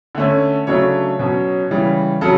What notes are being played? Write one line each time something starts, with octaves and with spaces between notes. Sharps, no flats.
D3 A3 C#4
C#3 F#3 A3 D4 C#5
B2 F#3 C#4
C#3 E3 G3
C#3 F#3 A4